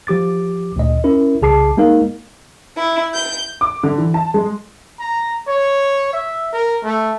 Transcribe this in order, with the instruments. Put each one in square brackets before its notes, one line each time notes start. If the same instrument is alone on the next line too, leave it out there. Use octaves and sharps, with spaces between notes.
[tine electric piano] F3 G4 D6 A6
D2 A#2 D#5
C#4 E4 A#4
C2 C#3 G#4 A5 D6 C7
G#3 A#3 D#4 A#4 F5
[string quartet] E4
G6
[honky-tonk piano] D6
D3
E3
A5
G#3
[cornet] A#5
C#5
E5
A#4
A3